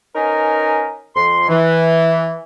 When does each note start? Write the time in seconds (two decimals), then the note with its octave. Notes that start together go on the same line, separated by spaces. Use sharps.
0.15 C#4 D#4 A#4 B4 D#5 G#5
1.14 F2 C6
1.49 E3